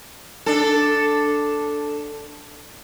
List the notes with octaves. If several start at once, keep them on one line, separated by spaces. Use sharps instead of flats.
D4 A4